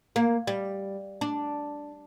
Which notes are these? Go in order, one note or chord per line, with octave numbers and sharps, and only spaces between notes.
A#3
G3
D4